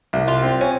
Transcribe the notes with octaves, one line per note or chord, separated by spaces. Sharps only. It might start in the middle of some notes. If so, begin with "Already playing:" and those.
C2
F4
C4
C#4